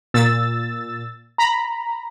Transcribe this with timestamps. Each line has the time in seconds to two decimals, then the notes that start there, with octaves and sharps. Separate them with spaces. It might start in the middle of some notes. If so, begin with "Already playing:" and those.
0.14 A#2 E6 A6
1.38 A#5 B5